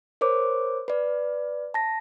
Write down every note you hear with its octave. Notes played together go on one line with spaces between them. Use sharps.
A#4 C5 C#5 D6
B4 D5
A5 A#6